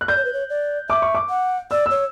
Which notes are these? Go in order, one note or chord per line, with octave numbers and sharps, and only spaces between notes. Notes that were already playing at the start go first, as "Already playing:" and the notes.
F#6
D5 G6
C#5
B4
C#5
D5
E5 D6
C#6
D6
F#5
D5 E6
C#5 E6